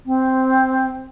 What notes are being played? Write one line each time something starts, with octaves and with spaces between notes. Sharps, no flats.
C4